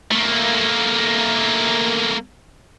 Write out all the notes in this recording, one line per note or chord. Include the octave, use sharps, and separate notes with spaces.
A3 A#3